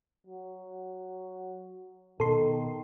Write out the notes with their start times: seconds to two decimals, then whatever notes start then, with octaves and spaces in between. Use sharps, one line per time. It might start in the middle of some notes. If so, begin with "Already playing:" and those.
0.26 F#3
2.20 B2 D#3 A4 C6